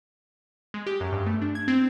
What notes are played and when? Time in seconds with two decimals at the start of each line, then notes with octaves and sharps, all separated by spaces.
0.74 G#3
0.86 G4
1.00 F#2
1.12 G2
1.26 A3
1.42 D4
1.55 G#6
1.68 C4